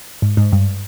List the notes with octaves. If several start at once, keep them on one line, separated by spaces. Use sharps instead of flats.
G#2
G#2
G2